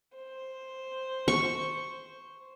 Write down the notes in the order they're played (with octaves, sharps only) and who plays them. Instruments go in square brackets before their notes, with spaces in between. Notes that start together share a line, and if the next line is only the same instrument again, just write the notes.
[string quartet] C5
[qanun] C#6